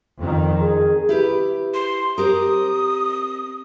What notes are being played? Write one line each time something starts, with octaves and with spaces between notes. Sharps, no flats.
F2 D#3
G#4
E4 G4 B4
C6
C4 G4 A#4 D#6